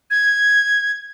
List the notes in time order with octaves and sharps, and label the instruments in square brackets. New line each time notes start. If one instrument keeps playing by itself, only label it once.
[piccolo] G#6